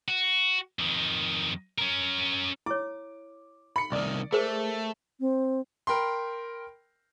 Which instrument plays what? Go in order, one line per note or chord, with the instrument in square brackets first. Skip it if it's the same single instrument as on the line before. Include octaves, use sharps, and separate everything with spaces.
[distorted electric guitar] F#4
F2 D#3
C#4 A#4
[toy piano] E4 C#5 [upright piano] D6
[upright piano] B5 C#7
[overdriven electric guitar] C2 D#3 [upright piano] D5
[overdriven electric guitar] A3 [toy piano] G#4 A#4 C5
[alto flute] C4
[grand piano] A#4 G5 B5 C6